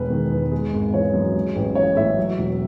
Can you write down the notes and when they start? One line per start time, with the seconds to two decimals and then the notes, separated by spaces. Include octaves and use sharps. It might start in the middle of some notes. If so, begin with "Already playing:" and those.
Already playing: E1 G#3 B4
0.10 D#3
0.31 E2
0.52 G#3
0.73 G#1
0.93 E3 C#5
1.13 F#2
1.35 G#3
1.56 A1
1.75 E3 C#5
1.96 A2 E5
2.18 F#3
2.38 E1